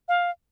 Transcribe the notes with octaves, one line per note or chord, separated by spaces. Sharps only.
F5